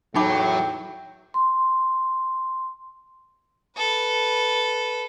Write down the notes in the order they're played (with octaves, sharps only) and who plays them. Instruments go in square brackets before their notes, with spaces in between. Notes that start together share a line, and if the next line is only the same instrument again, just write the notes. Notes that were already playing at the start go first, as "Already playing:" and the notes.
[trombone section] E2 A2 [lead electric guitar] F#3 [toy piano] D#4 B5 D6 [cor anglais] G5
[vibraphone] C6
[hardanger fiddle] A4 B4